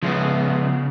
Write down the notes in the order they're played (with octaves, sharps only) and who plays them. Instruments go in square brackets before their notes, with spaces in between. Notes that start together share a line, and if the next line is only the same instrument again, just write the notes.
[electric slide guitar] C#3 [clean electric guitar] F3 G#3 B3